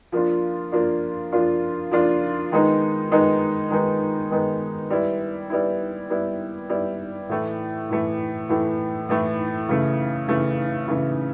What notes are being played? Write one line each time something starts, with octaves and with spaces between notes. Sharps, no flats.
F3 A#3 D4 F4
F3 A#3 D4 F4
F3 A#3 D4 F4
F3 A#3 D4 F4
D#3 G#3 B3 D#4
D#3 G#3 B3 D#4
D#3 G#3 B3 D#4
D#3 G#3 B3 D#4
G3 B3 E4
G3 B3 E4
G3 B3 E4
G3 B3 E4
A2 E3 A3
A2 E3 A3
A2 E3 A3
A2 E3 A3
C#3 E3 A3
C#3 E3 A3
C#3 E3 A3